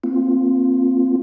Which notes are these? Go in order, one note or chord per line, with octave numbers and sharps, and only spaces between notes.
A#3 C4 F4